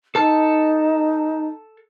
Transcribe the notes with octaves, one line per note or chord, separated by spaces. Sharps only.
D#4 A4 A5